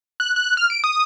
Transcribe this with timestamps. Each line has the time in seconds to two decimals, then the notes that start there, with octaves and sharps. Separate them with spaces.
0.20 F#6
0.36 F#6
0.57 F6
0.70 D7
0.84 D#6